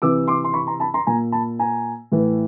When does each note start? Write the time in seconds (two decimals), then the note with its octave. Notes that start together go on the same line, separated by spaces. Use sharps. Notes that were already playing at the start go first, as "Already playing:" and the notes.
0.02 C3 E3 D6 E6
0.27 C6 D6
0.44 C6
0.54 B5 C#6
0.67 A#5 C6
0.80 A5 B5
0.94 A#5 C6
1.07 A#2 G#5 A#5
1.32 A5 B5
1.59 G#5 A#5
2.12 A2 E3